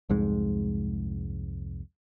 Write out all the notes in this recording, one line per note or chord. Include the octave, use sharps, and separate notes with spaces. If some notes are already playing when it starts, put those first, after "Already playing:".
C2 F2 G#2 G#3